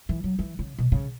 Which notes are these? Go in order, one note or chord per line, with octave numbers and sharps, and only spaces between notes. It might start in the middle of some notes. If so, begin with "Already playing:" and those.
E3
F#3
E3
C#3
B2
C#3